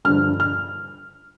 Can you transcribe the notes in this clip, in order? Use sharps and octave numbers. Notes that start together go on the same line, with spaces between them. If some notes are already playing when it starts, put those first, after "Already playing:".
G2 D3 F3 F6
F6